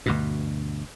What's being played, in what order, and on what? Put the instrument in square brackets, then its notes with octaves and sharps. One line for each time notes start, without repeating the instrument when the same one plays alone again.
[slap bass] D2 G2 B2